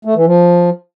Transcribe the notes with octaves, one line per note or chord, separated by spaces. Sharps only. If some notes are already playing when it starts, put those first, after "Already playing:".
A3
E3
F3